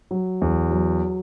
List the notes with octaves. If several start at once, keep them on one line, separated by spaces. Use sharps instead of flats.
F#3
E2
F#3